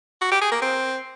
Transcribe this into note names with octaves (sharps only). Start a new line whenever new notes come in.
F#4
G4
G#4
A#3
C4